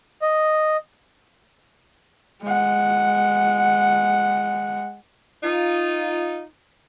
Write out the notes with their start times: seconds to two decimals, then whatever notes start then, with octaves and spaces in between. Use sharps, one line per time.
0.22 D#5
2.42 G#3 F#5
5.43 D#4 F4